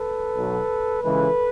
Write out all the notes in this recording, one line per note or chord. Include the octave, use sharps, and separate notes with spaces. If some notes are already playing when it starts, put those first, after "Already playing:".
Already playing: A4 B4
B1 B2 F#3
C#2 C#3 E3 G#3 A4 B4